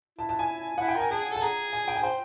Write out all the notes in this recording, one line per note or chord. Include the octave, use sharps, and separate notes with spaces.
E4 A5
A5
G#5
E4 F#5
G5
A#4 G#5
G#4 A5
A4 A5
G#4 A#5
G#5
G5
G#5
C5 G5